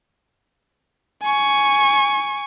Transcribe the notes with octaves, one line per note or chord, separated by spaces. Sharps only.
G#5 C#6